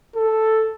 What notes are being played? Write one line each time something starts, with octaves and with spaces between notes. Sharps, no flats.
A4